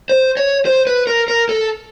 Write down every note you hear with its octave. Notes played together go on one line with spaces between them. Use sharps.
C5
C#5
C5
B4
A#4
A#4
A4